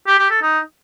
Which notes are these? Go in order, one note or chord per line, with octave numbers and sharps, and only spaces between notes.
G4
G4
A4
D#4